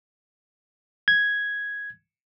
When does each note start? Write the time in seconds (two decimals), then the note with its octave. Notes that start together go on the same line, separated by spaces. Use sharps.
1.08 G#6